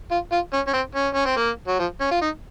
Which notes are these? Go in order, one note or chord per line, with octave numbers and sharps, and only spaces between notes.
F4
F4
C#4
C#4
C4
C#4
C#4
C4
A#3
F#3
F3
C#4
F4
D#4